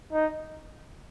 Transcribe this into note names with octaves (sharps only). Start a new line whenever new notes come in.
D#4